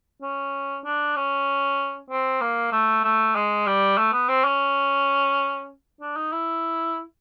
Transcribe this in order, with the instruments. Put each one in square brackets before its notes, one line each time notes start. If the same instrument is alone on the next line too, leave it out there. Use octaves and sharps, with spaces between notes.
[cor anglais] C#4
D4
C#4
C4
A#3
A3
A3
G#3
G3
A3
B3
C4
C#4
D4
D#4
E4